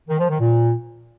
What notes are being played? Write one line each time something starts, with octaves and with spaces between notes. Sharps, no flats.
D#3
F3
D#3
A#2